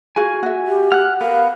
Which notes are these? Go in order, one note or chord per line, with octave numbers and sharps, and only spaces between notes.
F4 F#4 G#4 G#5
F#4 E5
G4
F#5 F6 F#6
B3 A#4 F5